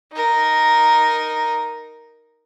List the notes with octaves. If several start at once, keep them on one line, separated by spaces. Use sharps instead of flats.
D#4 A#4